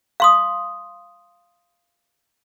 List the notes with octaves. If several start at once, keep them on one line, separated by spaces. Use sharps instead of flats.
F5 C6 D#6